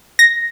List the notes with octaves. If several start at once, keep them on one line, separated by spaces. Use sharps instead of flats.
A#6